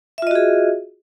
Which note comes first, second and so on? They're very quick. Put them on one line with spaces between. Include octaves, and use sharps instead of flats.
E5 F4 D#5 F#4 G#4